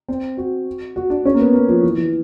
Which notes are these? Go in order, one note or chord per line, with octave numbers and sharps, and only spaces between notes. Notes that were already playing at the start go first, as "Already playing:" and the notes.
C4
F#4
F#4
D4
C#4
A#3
B3
A#3
F3
E3
E3